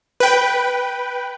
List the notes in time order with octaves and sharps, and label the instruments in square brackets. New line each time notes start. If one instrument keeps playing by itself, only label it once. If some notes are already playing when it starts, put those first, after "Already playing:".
[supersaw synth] B4 G5